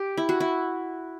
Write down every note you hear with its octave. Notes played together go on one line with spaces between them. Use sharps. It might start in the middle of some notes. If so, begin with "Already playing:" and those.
Already playing: G4
E4
F#4
E4